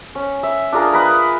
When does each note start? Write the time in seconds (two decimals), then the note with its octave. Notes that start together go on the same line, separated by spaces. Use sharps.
0.15 C#4
0.43 E5
0.72 D4 F4 G#4 A#4
0.93 A#4 B4 D#5 G#5